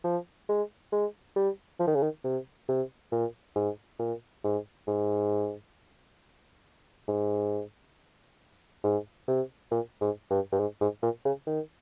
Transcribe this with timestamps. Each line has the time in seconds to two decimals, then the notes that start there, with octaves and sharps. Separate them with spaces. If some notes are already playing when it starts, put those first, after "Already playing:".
0.04 F3
0.49 G#3
0.93 G#3
1.36 G3
1.80 F3
1.87 D#3
1.96 C#3
2.03 D#3
2.24 C3
2.69 C3
3.12 A#2
3.56 G#2
4.00 A#2
4.44 G#2
4.87 G#2
7.08 G#2
8.84 G#2
9.28 C3
9.71 A#2
10.01 G#2
10.30 G2
10.52 G2
10.60 G#2
10.81 G#2
11.03 A#2
11.25 C#3
11.47 D#3